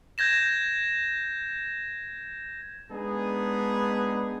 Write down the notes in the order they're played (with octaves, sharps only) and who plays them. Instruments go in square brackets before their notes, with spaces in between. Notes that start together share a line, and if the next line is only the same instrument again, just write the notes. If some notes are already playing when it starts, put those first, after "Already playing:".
[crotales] G6 G#6 A#6 E7
[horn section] G#3 B3 D4 D#4 G#4